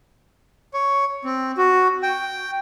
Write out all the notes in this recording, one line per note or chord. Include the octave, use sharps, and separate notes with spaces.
C#5
C4
F#4
G5